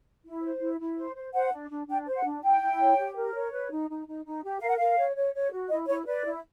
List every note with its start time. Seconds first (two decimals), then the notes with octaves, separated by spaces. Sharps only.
0.25 E4
0.43 C5
0.61 E4
0.80 E4
0.98 C5
1.16 C5
1.33 C5 F#5
1.52 D4
1.70 D4
1.88 D4 G5
2.07 C5
2.16 F#5
2.24 D4
2.43 E4 G5
2.61 E4
2.79 C#5
2.98 G4
3.16 A#4
3.34 C#5
3.52 B4
3.71 D#4
3.89 D#4
4.07 D#4
4.25 D#4
4.43 G4
4.61 A#4 F5
4.68 F#5
4.76 A#4 F5
4.97 C#5
5.16 C#5
5.34 C#5
5.52 F#4
5.70 E4 D#5
5.88 E4 C#5
6.06 B4 D5
6.25 E4